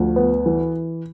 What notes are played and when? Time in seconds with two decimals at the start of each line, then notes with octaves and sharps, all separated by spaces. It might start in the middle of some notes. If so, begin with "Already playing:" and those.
Already playing: D2 F3
0.16 B3
0.46 E3